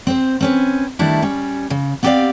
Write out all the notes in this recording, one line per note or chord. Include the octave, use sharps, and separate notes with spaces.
C4 C5
C4 C#4 B4
D#3 G3 A3 D4 E4
G3 C#4
C#3
B3 C4 G4 A4 D5 F5